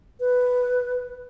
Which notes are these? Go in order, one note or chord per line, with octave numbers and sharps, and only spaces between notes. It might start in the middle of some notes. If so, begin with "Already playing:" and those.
B4